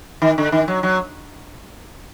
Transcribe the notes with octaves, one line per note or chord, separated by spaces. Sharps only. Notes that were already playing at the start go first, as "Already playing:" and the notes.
D#3
D3
D#3
F#3
F#3